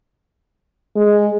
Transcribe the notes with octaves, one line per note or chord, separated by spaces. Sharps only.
G#3